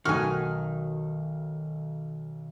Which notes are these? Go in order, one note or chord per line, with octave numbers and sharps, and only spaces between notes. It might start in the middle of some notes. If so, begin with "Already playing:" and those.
B1 D#3 A3 F#4 G#5 F6